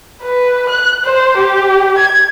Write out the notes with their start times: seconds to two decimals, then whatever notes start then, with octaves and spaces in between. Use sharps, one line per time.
0.23 B4
0.70 F#6
1.04 C5
1.37 G4
1.98 G#6